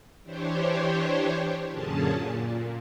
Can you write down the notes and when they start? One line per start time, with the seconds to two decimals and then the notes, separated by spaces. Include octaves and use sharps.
0.24 E3 D4 G4 C5 C#5
1.70 F#2 A#2 D3 C#4 G#4 A5
2.14 A#2